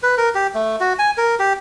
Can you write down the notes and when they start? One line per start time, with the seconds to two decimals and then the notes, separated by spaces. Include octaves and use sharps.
0.03 B4
0.17 A#4
0.35 G4
0.55 A3
0.80 F#4
0.99 G#5
1.17 A#4
1.39 G4